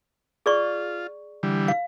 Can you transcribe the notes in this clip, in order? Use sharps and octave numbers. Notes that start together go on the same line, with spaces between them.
F4 G#4 D5 C#6
D3 E3 G3
F5